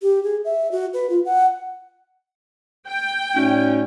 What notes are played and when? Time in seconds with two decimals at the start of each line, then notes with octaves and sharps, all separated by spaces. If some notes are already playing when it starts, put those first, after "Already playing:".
0.02 G4
0.24 G#4
0.45 E5
0.72 F#4
0.94 B4
1.10 F4
1.25 F#5
2.88 G5
3.34 A2 A3 C#4 D#4 F#4 D5